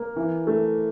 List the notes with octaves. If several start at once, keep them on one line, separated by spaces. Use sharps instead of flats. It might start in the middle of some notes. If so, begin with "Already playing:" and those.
Already playing: A#3
E3
A3